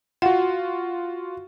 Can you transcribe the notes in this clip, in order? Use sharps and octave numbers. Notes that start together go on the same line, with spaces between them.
F4 F#4 F#5